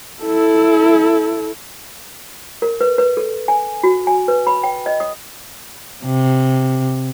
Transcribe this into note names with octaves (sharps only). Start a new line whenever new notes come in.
E4 A4
A#4
B4
B4
A4
G#5
F#4
G#5
B4
B5
G5
D#5
D#6
C3